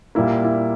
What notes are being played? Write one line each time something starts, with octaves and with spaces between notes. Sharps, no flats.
A#2 G3 A#3 E4
E4